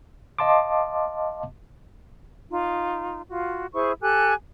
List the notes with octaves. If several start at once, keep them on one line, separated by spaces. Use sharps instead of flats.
D#5 F5 A5 C6 D6
D#4 F4
F4 F#4
E4 G#4 C5 C#6
G4 A4 G#5 F#6